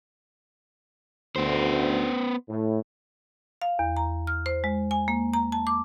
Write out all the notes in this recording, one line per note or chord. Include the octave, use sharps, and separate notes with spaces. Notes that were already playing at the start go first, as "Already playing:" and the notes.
D2 B3 C5
A2
F5
E2
A#5
F6
C5
G#3
G#5
A#3
A#5
A5
D6